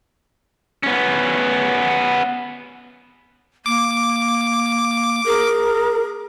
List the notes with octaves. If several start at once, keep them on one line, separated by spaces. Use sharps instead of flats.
B3 C#4
A#3 D6
G#4 A#4